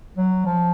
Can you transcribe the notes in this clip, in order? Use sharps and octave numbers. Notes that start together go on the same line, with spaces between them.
F#3
F3